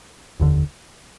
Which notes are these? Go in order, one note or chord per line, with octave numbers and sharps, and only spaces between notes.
F1 D#2 D3